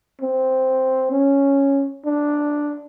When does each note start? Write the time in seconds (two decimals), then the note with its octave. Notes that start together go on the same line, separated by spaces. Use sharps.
0.21 C4
1.12 C#4
2.06 D4